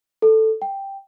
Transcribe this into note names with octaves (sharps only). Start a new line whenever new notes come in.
A4
G5